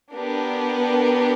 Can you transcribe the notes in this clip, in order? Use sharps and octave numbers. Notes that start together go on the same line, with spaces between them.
B3 D4 G4 A#4